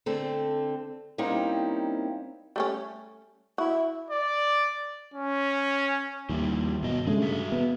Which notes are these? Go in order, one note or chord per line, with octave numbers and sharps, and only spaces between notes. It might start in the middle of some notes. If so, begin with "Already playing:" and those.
D3 A3 C4 A4
G3 A#3 C4 C#4 D#4 E4
G3 A3 C#4
E4 F#4
D5
C#4
D#2 F3 G3 E4
G2 B2 D#3 D#5
G2 C#3 G#3 A3
F#4 G#4 E5
B3